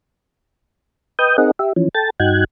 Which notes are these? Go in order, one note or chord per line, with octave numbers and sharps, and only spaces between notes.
B4 D#5 G5 D#6 G6
C4 D#4 G#4 A#4 D#5 F#5
G4 E5
E3 F3 C#4
A4 G5 A5 A6
G2 D#4 F#4 G5 F#6 G#6